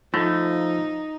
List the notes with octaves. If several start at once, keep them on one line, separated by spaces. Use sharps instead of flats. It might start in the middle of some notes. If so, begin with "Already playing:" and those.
F3 A3 D#4 F4